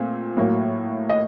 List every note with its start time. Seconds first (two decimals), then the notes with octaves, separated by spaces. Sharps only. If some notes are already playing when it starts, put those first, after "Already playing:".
Already playing: A#2 A3 C4
0.37 A2 F#3 A#3
1.09 D#5